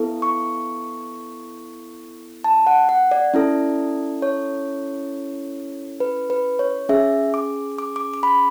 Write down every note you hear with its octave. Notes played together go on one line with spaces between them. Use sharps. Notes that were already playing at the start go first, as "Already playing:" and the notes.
Already playing: B3 E4 A4
C#6
A5
F#5
F#5
D5
C#4 E4 A4
C#5
B4
B4
C#5
C#4 G#4 E5
D6
D6
D6
D6
B5